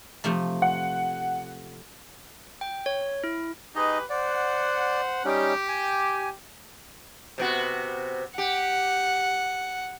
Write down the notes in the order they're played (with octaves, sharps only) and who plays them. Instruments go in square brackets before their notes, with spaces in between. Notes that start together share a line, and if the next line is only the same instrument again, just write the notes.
[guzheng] C3 F3 A3
[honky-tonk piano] F#5
[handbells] G5
C#5
E4
[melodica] D#4 D#5 [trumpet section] G4 G#4 B4
[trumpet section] C5 F#5 [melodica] D5
[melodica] G3 C#4 D#4 [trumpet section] G4
[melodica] G#5
[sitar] C3 B3 F#4
[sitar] G4 [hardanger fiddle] F#5